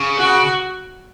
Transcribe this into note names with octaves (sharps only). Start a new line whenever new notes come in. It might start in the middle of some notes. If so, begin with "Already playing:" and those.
Already playing: C#3
F#4